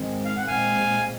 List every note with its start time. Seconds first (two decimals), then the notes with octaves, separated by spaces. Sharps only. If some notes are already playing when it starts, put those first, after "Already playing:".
Already playing: G#2 D#3 G#3 C4
0.25 F5
0.37 F#5
0.47 A#2 G#3 C4 F5 G#5